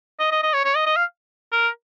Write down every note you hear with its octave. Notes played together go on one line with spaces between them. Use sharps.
D#5
D#5
D#5
C#5
C#5
D#5
D#5
F5
A#4